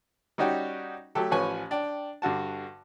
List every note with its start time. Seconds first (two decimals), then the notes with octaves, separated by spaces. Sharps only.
0.38 G3 C#4 D#4 F#4 G4
1.15 F#3 A3 G4 A4
1.31 A1 F3 B4 C#5 G#5 C#6
1.71 D4 G5
2.22 G2 D3 F#4 A5